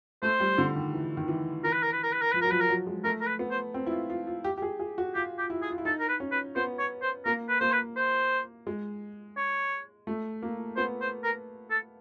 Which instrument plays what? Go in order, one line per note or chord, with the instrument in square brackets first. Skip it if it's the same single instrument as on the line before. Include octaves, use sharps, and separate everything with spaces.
[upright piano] A3 [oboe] C5
[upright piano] G3
D3
D#3
E3
D#3
E3
[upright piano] E3 [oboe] A#4
[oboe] B4
A#4
B4
A#4
B4
A#4
[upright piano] F3 [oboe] B4
[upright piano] F#3 [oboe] A#4
[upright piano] F3 [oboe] B4
[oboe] A#4
[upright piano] F#3
G#3
[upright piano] A3 [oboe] A#4
[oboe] A#4
B4
[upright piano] B3
[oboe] C5
[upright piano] C4
E4
F4
F4
F4
G4
G4
G#4
G#4
F#4
[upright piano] F4 [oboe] G4
[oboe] G4
[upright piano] E4
[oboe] G#4
[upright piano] F4
E4
[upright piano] D#4 [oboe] A4
[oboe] A#4
B4
[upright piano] C#4
[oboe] B4
[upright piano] B3 [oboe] C5
[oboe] C#5
C5
[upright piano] A#3 [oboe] A#4
[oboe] B4
[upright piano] A#3 [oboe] C5
[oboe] B4
C5
[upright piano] G#3
[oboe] C#5
[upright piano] A3
A#3
[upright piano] B3 [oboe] C5
[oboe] C5
A#4
A4